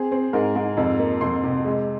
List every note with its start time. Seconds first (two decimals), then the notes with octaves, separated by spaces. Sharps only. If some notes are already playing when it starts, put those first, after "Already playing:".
Already playing: C4 G#4
0.12 C4
0.33 G#2 A#4
0.55 G#2
0.77 F2
0.99 A#3
1.21 F2 C6
1.43 C3
1.65 G#3